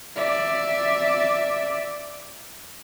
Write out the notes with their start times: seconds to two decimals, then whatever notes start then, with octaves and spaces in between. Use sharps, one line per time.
0.16 D5 E5